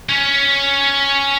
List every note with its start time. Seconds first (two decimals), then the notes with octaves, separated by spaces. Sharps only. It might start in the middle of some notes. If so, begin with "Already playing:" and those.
0.09 C#4